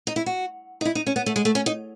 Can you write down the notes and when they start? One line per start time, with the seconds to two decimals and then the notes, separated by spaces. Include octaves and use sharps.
0.07 D#4
0.16 E4
0.26 F#4
0.81 D#4
0.85 E4
0.95 D#4
1.07 C#4
1.16 B3
1.26 A3
1.36 G#3
1.45 A3
1.55 C#4
1.66 D#4